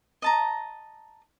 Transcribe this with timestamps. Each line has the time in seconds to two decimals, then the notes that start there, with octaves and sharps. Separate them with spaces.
0.22 D#5 A5 A#5